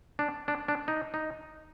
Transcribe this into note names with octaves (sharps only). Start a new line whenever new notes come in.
D4
D4
D4
D#4
D#4